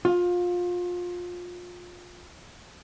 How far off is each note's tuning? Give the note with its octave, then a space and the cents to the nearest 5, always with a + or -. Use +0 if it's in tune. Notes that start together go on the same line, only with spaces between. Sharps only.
F4 +25